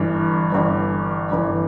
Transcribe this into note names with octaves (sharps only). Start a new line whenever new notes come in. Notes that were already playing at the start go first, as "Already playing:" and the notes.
Already playing: G1 G2 E3
G1 G2 E3
G1 G2 E3